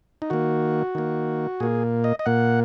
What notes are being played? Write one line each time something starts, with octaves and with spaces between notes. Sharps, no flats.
D#4
D#3 A#3 F#4
D#3 A#3
A#2 A#3 G#4
D#5
D#5
A#2 A#3 F#5